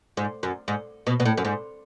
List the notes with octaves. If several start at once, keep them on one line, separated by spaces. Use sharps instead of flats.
G#2
F#2
G#2
B2
B2
A2
F#2
G#2